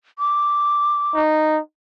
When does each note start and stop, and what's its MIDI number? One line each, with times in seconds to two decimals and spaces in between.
0.19 1.20 86
1.15 1.60 63